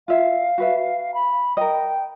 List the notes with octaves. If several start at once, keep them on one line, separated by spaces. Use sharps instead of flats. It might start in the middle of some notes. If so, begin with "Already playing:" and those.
F4 E5 F5
F#4 B4 E5
B5
A#4 D#5 G5